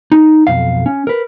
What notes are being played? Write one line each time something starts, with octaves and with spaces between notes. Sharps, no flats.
D#4
B1 F2 F5
C#4
A#4 B4